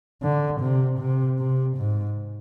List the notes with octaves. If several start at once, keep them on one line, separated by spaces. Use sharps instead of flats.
D3
C3
C3
C3
G#2